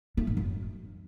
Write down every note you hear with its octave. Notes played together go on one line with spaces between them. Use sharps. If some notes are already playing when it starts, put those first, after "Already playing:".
A3
G#2
F#2